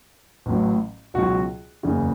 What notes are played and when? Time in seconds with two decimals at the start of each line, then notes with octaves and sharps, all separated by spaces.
0.46 A1 A2 F#3
1.14 C#2 B2 F#3 F#4
1.83 F#1 E2 C#3